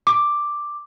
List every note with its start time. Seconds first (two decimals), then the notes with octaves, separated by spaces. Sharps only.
0.07 D6